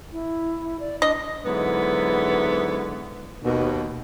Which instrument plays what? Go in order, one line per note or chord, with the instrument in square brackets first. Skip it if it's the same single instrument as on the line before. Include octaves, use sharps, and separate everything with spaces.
[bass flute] E4
D5
[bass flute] D4 [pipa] D#5
[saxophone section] G#2 D3 F#3 B3 E4
D#2 B2